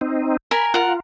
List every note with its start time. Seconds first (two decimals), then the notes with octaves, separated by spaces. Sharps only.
0.01 C4 D#4
0.51 A#4 G#5 B5
0.74 F4 A#4 F#5